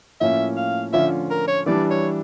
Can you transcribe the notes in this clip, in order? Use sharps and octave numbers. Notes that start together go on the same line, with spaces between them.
A2 F3 A#3 C#4 E5
F5
D3 F3 C#4 F4 E5
A#4
C#5
E3 G3 D4 D5
C#5